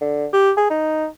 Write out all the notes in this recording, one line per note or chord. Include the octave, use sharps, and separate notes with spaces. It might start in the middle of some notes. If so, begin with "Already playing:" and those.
D3
G4
G#4
D#4